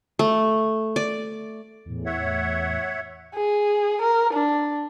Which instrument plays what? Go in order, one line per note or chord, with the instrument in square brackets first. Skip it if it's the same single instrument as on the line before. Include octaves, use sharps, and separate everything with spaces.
[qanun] A3
D5
[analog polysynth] E2 A2
[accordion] C#5 E5 F#5
[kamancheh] G#4
A#4
D4